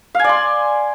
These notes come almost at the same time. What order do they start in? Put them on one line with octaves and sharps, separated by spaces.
F5 G#5 D5 C6